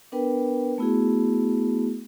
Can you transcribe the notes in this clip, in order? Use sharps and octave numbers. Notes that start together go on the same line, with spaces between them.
B3 D4 A#4 B4 G5
A3 B3 E4 F#4 G#4